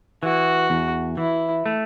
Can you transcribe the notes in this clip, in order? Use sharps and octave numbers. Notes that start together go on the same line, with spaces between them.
E3 F#4
E2
E3 E4
A3